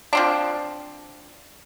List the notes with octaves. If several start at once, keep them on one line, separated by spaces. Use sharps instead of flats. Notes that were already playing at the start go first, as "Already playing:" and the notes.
F3 C4 D4